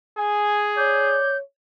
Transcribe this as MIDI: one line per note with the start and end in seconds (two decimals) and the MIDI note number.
0.18 1.17 68
0.18 0.66 80
0.77 1.40 73
0.77 1.32 74
0.77 1.37 91